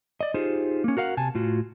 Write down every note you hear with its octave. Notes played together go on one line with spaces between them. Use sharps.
D5 D#5
D#4 F4 G4 G#4 C5
A#3 C#4
F#4 A#4 F5 F#5
C3 G#5 A5
A2 F4 F#4